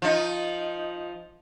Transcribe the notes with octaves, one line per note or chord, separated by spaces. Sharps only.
F3 D#4